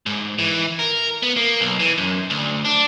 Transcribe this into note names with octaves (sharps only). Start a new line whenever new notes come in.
G#2
E3
A#4
B3
A#3
B1
E3
F#2
D2
D4